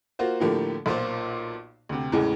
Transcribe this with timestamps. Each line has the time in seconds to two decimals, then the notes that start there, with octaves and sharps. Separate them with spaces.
0.19 A#3 F4 F#4 C5
0.40 A2 D3 F3 A3 A#3 G4
0.86 B1 A#2 F4 C5
1.89 D2 C3
2.12 E2 A2 C#3 E3 G#3